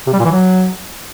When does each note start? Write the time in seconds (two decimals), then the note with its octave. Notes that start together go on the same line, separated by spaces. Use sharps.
0.07 C3
0.13 G3
0.19 A#2
0.25 E3
0.31 F#3